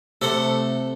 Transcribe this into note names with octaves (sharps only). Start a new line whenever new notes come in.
C3 A3 A4 C5 F#5